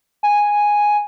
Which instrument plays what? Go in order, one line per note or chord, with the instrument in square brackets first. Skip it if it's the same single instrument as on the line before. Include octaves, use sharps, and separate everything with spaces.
[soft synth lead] G#5